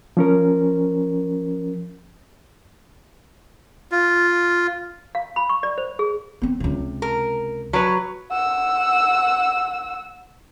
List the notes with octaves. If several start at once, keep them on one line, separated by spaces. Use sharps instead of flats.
F3 C#4 A#4
F4
F5
B5
C#6
D5
C5
G#4
B3 C4
C#2 C3
A#4
F#3 B4
F#5 E6